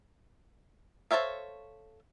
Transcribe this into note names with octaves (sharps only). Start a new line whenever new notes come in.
A4 C5 C#5 E5 F5